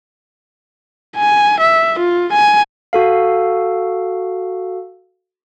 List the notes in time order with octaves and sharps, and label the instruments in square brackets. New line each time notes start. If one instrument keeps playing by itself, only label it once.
[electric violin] G#5
E5
F4
G#5
[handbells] F#4 A4 F5